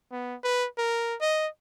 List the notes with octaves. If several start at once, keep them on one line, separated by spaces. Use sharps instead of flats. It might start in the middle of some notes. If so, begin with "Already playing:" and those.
B3
B4
A#4
D#5